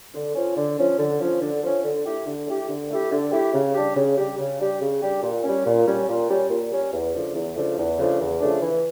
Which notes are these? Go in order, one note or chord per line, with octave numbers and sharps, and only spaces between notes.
D3
F3 C#4
D3
F3 C#4
D3
F3 C#4
D3
F3 C#4
D3
A3 E4 G4
D3
A3 E4 G4
D3
A3 E4 G4
D3
A3 E4 G4
C#3
G3 D4 G4
C#3
G3 D4 G4
C#3
G3 D4 G4
C#3
G3 D4 G4
A#2
G3 C#4
A#2
G3 C#4
A#2
G3 C#4
A#2
G3 C#4
E2
C#3 F3 A3 D4
E2
C#3 F3 A3 D4
E2
C#3 F3 A3 D4
E2
C#3 F3 A3 D4
E3